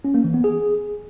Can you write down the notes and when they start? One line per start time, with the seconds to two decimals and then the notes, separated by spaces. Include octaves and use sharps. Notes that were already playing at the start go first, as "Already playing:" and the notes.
0.05 C#4
0.14 A#3
0.24 E3
0.34 B3
0.44 G#4